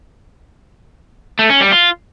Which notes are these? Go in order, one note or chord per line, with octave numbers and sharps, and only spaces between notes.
A3
C#4
G3
F4